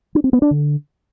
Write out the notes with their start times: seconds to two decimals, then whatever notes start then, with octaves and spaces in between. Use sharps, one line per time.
0.15 D4
0.24 C4
0.33 B3
0.42 D4
0.51 D3